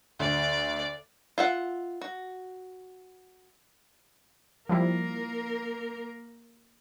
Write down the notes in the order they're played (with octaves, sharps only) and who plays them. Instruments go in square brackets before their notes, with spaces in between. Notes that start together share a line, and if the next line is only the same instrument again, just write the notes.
[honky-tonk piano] D2 [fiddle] D5
[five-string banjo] F4 E5 F#5
F#4
[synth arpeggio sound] F3 G3 E4 [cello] A#3 A#4